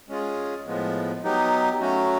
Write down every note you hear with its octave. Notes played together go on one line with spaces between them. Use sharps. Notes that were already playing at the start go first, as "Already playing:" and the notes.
G#3 C#4 F4 G#4
A2 F3 G#3 B3
F#3 B3 D#4 G4
F#3 A3 C#4 F#4